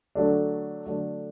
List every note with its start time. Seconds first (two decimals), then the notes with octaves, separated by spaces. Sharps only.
0.15 D3 F#3 A3 D4
0.87 D3 F#3 A3 D4